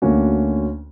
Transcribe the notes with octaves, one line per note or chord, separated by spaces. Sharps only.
D2 D3 A#3 C#4 F#4